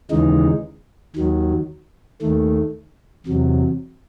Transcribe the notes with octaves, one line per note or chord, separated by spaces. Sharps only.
D#2 C#3 E3 G#3 D#4
D#2 D#3 F#3
D#2 D#3 A3
E2 C3 F#3